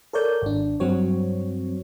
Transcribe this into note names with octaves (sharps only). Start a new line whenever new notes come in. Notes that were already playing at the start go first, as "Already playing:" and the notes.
A4 A#4 C#5 D5 G6
G#1 D4
G2 F#3 C4 C#5